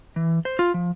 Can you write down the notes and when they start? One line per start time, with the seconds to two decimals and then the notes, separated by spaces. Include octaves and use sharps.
0.16 E3
0.45 C5
0.59 F4
0.74 F3